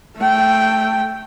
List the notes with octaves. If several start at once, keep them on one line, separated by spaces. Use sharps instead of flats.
A3 G5